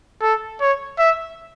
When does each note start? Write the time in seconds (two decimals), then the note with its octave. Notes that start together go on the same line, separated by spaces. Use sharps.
0.22 A4
0.61 C#5
0.99 E5